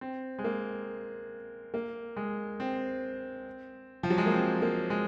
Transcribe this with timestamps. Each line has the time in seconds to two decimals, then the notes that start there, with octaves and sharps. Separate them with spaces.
0.01 C4
0.39 G#3
0.44 A#3
1.74 A#3
2.17 G#3
2.60 C4
4.03 F3
4.10 F#3
4.18 G#3
4.26 A#3
4.34 C4
4.62 A#3
4.90 G#3